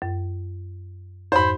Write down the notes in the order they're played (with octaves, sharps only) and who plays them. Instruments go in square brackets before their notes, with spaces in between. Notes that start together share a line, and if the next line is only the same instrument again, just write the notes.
[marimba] F#2
[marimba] F2 G#2 [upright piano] C5 B5